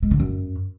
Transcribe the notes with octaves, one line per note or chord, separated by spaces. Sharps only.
G#3
D3
F#2